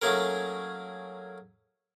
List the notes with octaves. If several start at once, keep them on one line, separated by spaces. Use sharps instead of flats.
F#3 A3 A#3 C#4 G#4 A#4